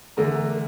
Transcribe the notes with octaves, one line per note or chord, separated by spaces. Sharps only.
E2 D3 A3 A#4